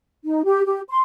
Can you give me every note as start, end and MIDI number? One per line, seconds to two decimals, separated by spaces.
0.24 0.41 63
0.45 0.63 67
0.65 0.80 67
0.89 1.01 84